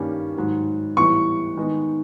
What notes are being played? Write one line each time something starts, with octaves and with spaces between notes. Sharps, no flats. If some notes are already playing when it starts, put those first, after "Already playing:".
Already playing: G2 D#3 G3 A#3 C#4
G#2 D#3 F#3
A2 E3 G3 B3 C#6
D#3 G#3 B3 D#4